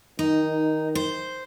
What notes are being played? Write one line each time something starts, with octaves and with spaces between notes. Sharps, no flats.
D#3 D#4
C5